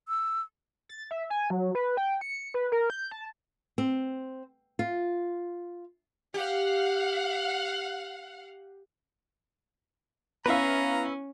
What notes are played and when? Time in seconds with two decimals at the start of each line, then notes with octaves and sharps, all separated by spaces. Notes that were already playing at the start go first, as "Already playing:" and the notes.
0.08 E6
0.89 A6
1.11 E5
1.30 G#5
1.50 F#3
1.75 B4
1.97 G5
2.21 C#7
2.54 B4
2.72 A#4
2.90 G6
3.11 A5
3.78 C4
4.79 F4
6.34 G4 F5 F#5
10.46 B3 C#4 E4 B4 E5 F5 A#5